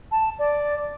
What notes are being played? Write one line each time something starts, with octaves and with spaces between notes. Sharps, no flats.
A5
D5